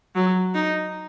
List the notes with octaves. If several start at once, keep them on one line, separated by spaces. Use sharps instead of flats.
F#3
D#4